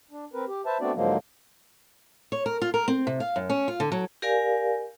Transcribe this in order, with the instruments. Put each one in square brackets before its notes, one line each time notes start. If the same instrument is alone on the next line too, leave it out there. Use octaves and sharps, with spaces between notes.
[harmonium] D4
C4 A#4 B4
G4
B4 C5 E5 A5
A3 B3 C4 D4 F#4 D5
G#2 D3 F3 F#3 G#3 A#3
[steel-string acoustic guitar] C#5
A#4
F4
A#4
C4
C3
F5
F#2
C#4
F4
D3
F#3
[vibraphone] G4 A#4 D5 F5 G#5